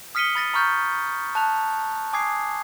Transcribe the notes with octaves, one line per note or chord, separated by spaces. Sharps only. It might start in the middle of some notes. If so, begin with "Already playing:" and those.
D#6 F6 B6 C#7 D#7 G7
B5 A6 A#6 D#7
A#5 B5 C#6 F6 G6 A6
A5 F#6 F7
G#5 D6 D#6 G#6 C7